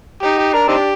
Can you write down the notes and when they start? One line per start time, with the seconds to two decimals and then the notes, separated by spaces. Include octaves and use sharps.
0.23 D#4 G4
0.38 G4
0.53 D4 A#4
0.68 C4 D#4 G4